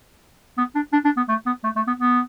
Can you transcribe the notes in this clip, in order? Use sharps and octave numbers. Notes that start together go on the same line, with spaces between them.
B3
D4
D4
D4
B3
A3
B3
A3
A3
B3
B3